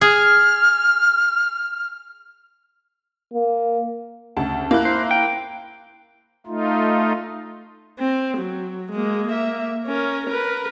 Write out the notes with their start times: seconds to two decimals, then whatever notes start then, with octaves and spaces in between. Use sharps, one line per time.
0.01 G#4 F6
3.34 A#3
4.37 D2 C#3 A5
4.71 A#3 E4 F#6
4.85 C5
5.11 G5
6.47 A3 D#4 F4
7.99 C4
8.38 F#3
8.92 G#3 A#3
9.28 A#3 E5
9.87 C#4 A#4
10.27 A#4 B4